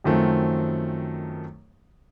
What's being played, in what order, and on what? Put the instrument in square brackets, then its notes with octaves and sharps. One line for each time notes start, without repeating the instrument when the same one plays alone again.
[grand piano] F#2 D#3 F3 A3 C4